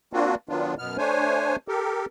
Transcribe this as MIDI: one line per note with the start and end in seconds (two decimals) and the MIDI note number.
0.13 0.35 58
0.13 0.35 60
0.13 0.35 62
0.13 0.35 65
0.13 0.35 66
0.49 0.74 51
0.49 0.74 54
0.49 0.74 59
0.49 0.74 62
0.49 0.74 65
0.79 0.97 42
0.79 0.97 47
0.79 0.97 59
0.79 0.97 89
0.98 1.56 57
0.98 1.56 62
0.98 1.56 72
0.98 1.56 73
0.98 1.56 80
1.68 2.06 67
1.68 2.06 69
1.68 2.06 70